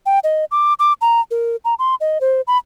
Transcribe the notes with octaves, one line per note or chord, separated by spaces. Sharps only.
G5
D#5
D6
D6
A#5
A#4
A#5
C6
D#5
C5
B5